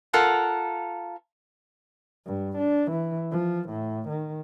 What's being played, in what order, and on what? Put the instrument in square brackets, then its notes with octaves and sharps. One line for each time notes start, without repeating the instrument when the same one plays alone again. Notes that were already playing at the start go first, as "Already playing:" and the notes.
[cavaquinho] F4 A4 A#4 F#5
[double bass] G2
D4
E3
F3
A2
D#3